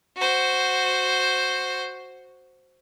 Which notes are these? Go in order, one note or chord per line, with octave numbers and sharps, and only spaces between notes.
F#4 C5